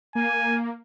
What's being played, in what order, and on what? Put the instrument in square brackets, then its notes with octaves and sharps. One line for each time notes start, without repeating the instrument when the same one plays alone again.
[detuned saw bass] A#3 [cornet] G#5